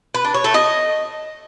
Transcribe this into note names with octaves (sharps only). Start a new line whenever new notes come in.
B4
D4
C#5
A3
D#5